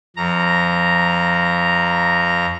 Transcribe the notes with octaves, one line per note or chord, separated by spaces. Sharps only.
F2 A#5